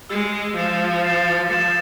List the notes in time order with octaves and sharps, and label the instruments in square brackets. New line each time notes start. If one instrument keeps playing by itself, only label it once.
[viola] G#3 [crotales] E6 G#6 C7
[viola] F3 [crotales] A6 C7 E7
[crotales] A6 C7 E7
[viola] F3 [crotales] A6 C7 E7